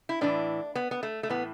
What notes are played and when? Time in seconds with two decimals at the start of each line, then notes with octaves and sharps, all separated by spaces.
0.09 E4
0.21 A2 E3 D4
0.75 B3
0.91 B3
1.03 A3
1.23 A3
1.29 A2 E3 B3